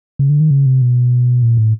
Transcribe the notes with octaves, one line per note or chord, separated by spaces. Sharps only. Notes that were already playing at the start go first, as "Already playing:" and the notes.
C#3
D3
D#3
C#3
C3
B2
A#2
A2